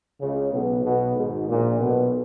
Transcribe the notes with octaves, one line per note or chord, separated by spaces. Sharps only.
C#2 C#3
B1 B2
B1 B2
G#1 G#2
A#1 A#2
B1 B2